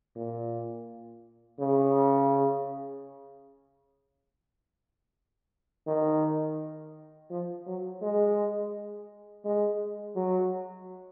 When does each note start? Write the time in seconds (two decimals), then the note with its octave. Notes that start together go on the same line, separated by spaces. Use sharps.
0.16 A#2
1.59 C#3
5.87 D#3
7.30 F3
7.66 F#3
8.02 G#3
9.44 G#3
10.16 F#3